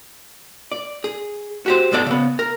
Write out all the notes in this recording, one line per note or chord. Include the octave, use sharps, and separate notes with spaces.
D5
G#4
F#4 G4 C5
C2 G#2 G#3 B3 A4 D5
C#3 B3
A#4